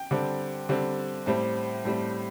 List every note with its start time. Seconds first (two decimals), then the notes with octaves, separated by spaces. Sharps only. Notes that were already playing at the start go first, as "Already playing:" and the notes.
Already playing: G5
0.11 D3 G3 C4
0.69 D3 G3 C4
1.26 A2 G3 C4 A5
1.85 A2 G3 C4